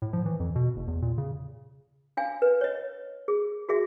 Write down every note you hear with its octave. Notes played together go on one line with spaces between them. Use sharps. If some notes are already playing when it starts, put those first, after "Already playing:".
A2
F3
E3
F2
B2
F#1
E2
A#2
C#3
D4 F5 G#5
B4
C#5 D#5
G#4
F#4 G#4 E5